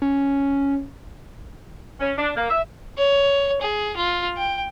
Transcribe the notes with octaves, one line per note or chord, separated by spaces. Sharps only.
C#4
C#4
D4
A#3
E5
C#5
G#4
F4
G5